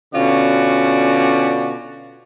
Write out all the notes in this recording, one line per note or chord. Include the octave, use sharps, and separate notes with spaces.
B2 D3 C#4 F4 F#4 D5